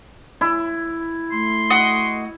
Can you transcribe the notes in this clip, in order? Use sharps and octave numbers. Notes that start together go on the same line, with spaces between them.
E4
A3 C6
F#4 D#5